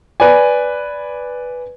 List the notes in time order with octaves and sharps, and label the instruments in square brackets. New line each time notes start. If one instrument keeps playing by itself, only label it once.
[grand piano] B4 D5 G#5